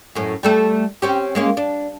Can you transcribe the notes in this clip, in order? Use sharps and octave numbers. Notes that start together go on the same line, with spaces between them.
F#2 A2
G3 A3 A4
C4 C#4 G4
G#3 A#3 C#4
D4